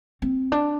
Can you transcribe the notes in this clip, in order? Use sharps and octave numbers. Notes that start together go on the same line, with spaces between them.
C4
D4